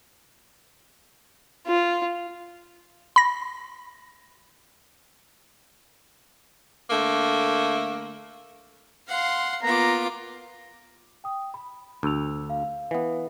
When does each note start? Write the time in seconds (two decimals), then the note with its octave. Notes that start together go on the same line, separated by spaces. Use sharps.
1.67 F4
3.16 B5 A#6
6.90 D3 A3 A#3
9.08 F5 F#5 C6
9.63 A#3 B3 F4 A#5 D6
11.24 G5 D#6
11.54 B5
12.03 D2 D4 E6 F7
12.50 F5
12.91 E3 B3